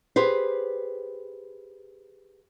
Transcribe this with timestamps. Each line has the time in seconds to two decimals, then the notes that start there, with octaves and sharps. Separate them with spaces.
0.16 G4 G#4 B4 C5